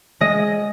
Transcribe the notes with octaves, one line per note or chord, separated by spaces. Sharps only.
G#3 D#5